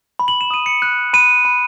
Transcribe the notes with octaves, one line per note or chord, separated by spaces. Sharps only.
B5
F#7
E7
D#6 D#7
C#7
F#6
B5 D#7
B5